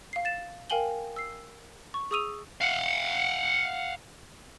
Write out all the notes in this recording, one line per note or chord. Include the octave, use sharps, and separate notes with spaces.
F5 C7
A6 E7
A#4 F5 G5 G#5 F#7 G7
E6 C7
C#6
G#4 C#6 D#6 E6 D#7 F7
F5 F#5